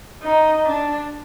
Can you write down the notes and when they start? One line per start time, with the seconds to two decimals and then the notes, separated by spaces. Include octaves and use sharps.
0.22 D#4
0.66 D4